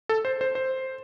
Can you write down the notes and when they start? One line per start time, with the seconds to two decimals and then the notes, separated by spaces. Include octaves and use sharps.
0.09 A4
0.25 C5
0.41 C5
0.55 C5